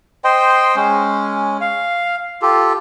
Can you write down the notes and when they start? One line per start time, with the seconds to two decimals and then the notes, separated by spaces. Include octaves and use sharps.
0.24 C5 D#5 G5 C6
0.76 G#3 C#4
1.61 F5
2.42 F4 G4 A4